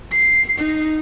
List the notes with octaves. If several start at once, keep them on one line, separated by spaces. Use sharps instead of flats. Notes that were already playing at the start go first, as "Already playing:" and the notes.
C7
D#4